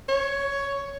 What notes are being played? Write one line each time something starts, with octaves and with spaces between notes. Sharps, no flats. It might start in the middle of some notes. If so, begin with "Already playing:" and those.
C#5